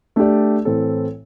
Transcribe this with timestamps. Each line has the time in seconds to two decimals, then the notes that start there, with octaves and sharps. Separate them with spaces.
0.16 A3 D4 G4 D5
0.65 A2 E3 C4 A4